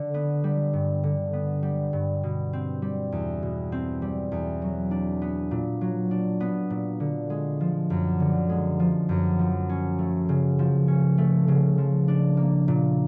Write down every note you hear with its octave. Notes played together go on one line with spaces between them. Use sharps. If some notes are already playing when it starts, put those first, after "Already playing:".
Already playing: D3
B3
G3
G2
D3
B3
G3
G2
B2
C4
G3
E2
B2
C4
G3
E2
F#3
D4
B3
A#2
F#3
D4
B3
A#2
D3
G#3
F3
F#2
D3
G#3
F3
F#2
F3
C#4
A3
C#3
F3
C#4
A3
C#3
F3
D4
A#3
A#2